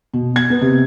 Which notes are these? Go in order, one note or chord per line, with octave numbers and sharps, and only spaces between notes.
B2
G#6
B3
C3